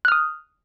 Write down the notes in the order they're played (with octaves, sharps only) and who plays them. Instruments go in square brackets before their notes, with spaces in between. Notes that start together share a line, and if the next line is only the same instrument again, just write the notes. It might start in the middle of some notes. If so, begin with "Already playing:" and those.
[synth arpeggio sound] F#6
F6
D#6